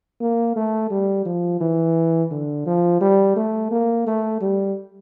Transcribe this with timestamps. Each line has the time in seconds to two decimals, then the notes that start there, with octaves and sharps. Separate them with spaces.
0.21 A#3
0.56 A3
0.91 G3
1.26 F3
1.60 E3
2.31 D3
2.66 F3
3.01 G3
3.36 A3
3.71 A#3
4.07 A3
4.41 G3